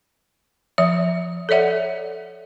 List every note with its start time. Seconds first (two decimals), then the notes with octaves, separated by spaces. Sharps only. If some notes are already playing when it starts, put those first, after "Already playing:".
0.78 F3 E5
1.49 A4 C#5 D5 E5 F#5